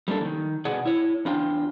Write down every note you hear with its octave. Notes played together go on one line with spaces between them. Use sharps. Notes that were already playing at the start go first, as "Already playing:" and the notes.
G3 A#3 D4 A4
D#3 E3
B2 G#4 D5 F#5
E4 C#5
E2 D4 F4 G5